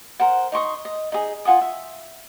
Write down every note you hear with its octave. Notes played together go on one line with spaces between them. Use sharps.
A#4 C5 F#5
D#4 C6 C#6 D#6
D#5
D#4 G#4
F4 F#5 G#5 D#6
E5